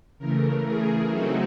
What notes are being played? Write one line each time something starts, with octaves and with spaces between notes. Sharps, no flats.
C#3 E3 A3 A#4
G#4
F#3 A3 C4 D#4 F#4